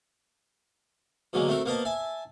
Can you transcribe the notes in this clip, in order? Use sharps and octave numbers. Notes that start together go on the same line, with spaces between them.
B2 D3 F#3 G#3 A#3
A3 C4 F#4 A#4
A#3 B3 A#4 C5 D#5 A5
E5 G#5 A5